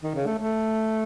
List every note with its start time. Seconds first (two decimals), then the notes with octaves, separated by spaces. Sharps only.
0.02 D#3
0.15 C#3
0.26 A3
0.39 A3